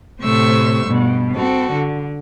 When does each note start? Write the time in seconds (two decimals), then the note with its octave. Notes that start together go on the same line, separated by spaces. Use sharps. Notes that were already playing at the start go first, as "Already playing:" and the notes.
0.22 A2 C3 A3 C5 C#6 E6
0.86 G2 B2
1.35 C4 F#4 A4
1.73 D3